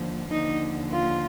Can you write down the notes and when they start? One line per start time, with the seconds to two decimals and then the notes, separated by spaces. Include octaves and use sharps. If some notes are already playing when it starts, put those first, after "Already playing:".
Already playing: D#2 D3 F3
0.31 D#2 D3 F3 D#4
0.92 F4